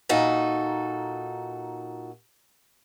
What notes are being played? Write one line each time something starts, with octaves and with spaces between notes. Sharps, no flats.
A#2 D#4 F#4 A4